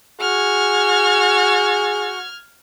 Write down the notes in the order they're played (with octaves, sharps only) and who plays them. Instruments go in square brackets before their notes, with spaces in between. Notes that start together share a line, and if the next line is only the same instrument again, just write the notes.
[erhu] F#4 [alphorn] G#4 [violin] F6 G#6